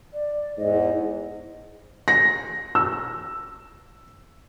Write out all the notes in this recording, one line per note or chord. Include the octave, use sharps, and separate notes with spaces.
D5
E2 G#2 D#5
A#6
E6